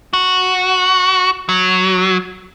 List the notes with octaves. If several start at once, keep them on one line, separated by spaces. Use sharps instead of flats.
F#4
F#3